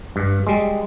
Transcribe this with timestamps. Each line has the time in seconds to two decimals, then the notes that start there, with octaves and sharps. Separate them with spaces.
0.16 G2
0.47 G3 G#3